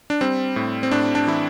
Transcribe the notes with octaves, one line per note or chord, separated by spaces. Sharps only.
D4
G3 C4
A2
C4
A2 D4
D4
E3 E4